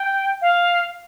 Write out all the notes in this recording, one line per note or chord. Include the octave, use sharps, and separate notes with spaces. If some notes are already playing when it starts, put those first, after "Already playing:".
Already playing: G5
F5